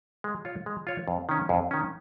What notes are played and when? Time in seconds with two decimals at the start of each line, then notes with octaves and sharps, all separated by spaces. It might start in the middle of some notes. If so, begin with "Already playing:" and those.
0.24 G#3
0.45 F4 C#5
0.66 G#3
0.87 F4 C#5
1.08 F2
1.29 D#3 C#4
1.49 F2
1.71 D#3 C#4